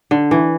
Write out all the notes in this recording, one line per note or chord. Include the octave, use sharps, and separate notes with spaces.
D3
E3